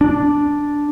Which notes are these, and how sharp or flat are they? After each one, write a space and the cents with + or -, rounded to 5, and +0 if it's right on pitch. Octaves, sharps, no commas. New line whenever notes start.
D4 -5